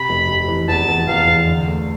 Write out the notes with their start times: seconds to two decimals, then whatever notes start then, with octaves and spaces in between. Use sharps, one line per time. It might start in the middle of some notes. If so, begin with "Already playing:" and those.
Already playing: C3 B5
0.09 F1
0.28 C3
0.48 E3
0.68 E2 A5
0.88 E2
1.08 E2 F5
1.27 E2
1.47 D3
1.67 A3